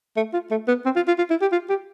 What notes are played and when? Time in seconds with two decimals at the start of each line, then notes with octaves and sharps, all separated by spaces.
0.16 A3
0.33 F4
0.51 A3
0.68 B3
0.85 C4
0.96 F4
1.07 F4
1.18 F4
1.30 E4
1.41 G4
1.52 F4
1.69 G4